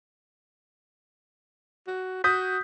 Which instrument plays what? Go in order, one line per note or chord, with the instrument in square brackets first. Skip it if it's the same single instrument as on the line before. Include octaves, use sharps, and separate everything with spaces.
[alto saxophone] F#4
[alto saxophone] F#4 [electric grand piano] D#6 G6 B6